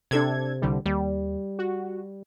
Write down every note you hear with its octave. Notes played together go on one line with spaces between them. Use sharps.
C3 D4 A4 G#6
C2 D3 G3
D#2 G3
F#4